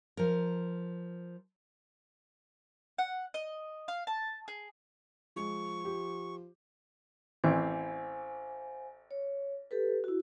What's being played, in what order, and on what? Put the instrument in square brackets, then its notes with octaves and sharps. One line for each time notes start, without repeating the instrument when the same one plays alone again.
[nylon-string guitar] F3 A#4
[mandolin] F#5
D#5
F5
A5
G#4
[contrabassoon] F3 [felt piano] G#3 [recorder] C#6
[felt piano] G4
[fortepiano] A1 E3 C4 [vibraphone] C5 F5 G#5
[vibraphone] C#5
G4 A4 B4
E4 F#4